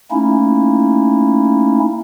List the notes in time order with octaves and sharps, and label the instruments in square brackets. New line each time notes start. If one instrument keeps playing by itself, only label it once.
[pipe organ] A3 A#3 C#4 D#4 E4